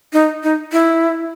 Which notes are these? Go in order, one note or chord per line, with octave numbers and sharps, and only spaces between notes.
D#4
D#4
E4